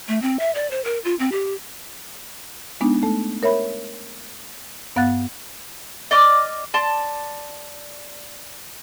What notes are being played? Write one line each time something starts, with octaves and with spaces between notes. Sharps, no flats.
A3
C4
E5
D5
C5
A#4
F4
C4
G4
G#3 B3 D4 D#4
A3 A4
A#4 C#5 E5 B5
G2 B3 F5 F#5 F#6 A6
D5 D#5 D6 F6
D5 A5 C6